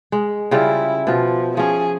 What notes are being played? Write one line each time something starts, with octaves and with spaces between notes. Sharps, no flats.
G#3
C#3 G3 E4 F4
B2 F3 F4
F3 C#4 G#4